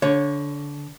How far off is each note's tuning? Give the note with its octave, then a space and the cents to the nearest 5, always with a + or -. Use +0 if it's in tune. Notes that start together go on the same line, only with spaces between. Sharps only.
D3 -20 C#5 +0